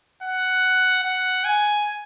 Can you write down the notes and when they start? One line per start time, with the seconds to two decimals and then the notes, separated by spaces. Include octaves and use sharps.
0.23 F#5
1.04 F#5
1.45 G#5